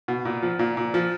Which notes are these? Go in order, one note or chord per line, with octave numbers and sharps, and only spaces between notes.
B2
A#2
F3
A#2
A#2
F3